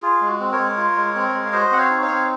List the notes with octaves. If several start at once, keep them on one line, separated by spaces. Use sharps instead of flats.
F4 G#4
G#3
F#4
C4
A#4 C#5
G#3
F4
G#3
C4
G#3
F5
F#4 C5 D#5
C4 F#5
C#5 F5
D#4
C#5 F5
C4